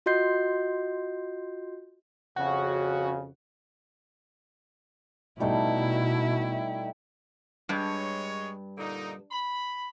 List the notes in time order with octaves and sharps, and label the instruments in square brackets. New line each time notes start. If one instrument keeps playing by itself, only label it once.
[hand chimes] F4 F#4 D#5 C6 G6 C7
[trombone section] F2 C#3 [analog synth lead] F#4
[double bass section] B2 [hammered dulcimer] G3 A3 D#4 [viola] E4
[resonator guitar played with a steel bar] G2 [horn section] G#3 C#5
[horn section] A#2 D3 D#4
B5